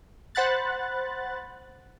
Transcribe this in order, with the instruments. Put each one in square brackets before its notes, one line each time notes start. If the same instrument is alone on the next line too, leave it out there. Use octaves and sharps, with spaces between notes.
[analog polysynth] C5 F#5 B5 F#6 A6